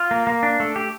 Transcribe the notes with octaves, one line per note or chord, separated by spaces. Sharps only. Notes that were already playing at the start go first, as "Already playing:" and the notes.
Already playing: F4
A#3
A#3
D4
A3
G4